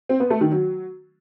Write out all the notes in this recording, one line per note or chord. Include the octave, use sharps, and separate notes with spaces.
C4
B3
A3
D#3
F#3